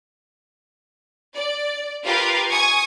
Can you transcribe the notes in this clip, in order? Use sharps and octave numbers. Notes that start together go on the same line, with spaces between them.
D5
F4 G4 A#4 B4 F5
G#5 C#6 D#6 G#6